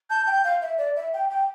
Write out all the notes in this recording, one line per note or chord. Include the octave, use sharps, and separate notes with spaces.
A5 G6
G5
F5
E5
D5
E5
G5
G5